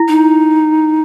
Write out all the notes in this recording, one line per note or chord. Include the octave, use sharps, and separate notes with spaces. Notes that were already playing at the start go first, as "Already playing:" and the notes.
Already playing: E4
D#4